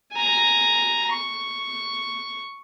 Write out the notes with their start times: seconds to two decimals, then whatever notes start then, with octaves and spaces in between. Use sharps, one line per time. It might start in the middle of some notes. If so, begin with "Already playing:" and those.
0.13 G#5 A#5
1.11 C#6